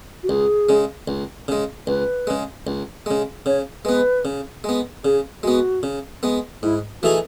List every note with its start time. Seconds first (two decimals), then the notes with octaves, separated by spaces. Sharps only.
0.23 F#4
0.29 C#2 G#4
0.69 C#3 G#3
1.08 C#2
1.48 C#3 G#3
1.87 C#2 B4
2.27 C#3 G#3
2.67 C#2
3.06 C#3 G#3
3.46 C#3 C#5
3.85 G#3 B3 B4
4.25 C#3
4.64 G#3 B3
5.04 C#3 G#4
5.43 G#3 B3 F#4
5.83 C#3
6.23 G#3 B3
6.63 G#2 E4
7.02 E3 A3 D#4 F#4 G#4